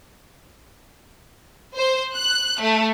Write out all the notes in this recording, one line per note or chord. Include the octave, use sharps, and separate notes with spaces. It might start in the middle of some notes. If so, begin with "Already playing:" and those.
C5
F#6
A3